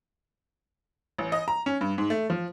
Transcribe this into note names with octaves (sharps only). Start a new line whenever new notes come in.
A1
D#5
A#5
C#4
G2
G#2
A3
F3